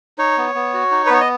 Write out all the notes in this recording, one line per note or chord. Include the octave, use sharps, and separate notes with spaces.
D#4 C#5
B3
B3
F#4
D#4
B4
B3 C#5
D#5